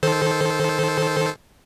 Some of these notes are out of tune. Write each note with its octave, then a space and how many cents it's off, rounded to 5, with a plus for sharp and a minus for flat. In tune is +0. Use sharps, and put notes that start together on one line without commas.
D#3 +0 A4 -15 C5 +0